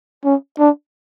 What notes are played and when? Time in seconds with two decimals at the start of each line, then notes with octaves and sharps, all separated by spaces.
0.25 C#4
0.59 D4